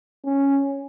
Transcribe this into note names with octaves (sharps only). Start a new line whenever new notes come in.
C#4